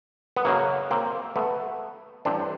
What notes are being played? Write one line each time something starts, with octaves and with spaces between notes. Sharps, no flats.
B3
F#2 C#3 F#3 A#3
A#3 C4
A3 B3
A1 G2 E3 C4 D4